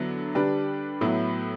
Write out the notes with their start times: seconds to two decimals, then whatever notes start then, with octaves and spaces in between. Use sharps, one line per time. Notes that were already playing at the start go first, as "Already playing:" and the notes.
Already playing: D3 F#3 B3 E4
0.35 D3 G3 D4 G4 B4
1.01 A2 F#3 B3 E4